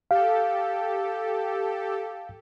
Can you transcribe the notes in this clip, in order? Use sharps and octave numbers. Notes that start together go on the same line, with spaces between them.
G4 A4 F5